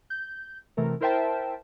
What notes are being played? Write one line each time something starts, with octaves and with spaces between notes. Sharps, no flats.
G6
C3 E3 A3 A#4
E4 A#4 C5 E5 G5 A5